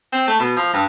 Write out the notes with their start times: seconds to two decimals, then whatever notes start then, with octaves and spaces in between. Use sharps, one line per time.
0.13 C4
0.28 A3
0.40 B2
0.57 F3
0.74 G2